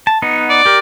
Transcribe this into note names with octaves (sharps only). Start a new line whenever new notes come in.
A5
B3 D#4 F#5
D5
G4 A#4